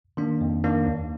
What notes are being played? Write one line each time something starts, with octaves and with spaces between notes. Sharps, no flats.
D#3 A#3 D4
F2
D#3 A#3 D4
D#2